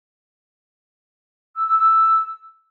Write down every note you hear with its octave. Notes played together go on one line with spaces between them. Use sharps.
E6
E6
E6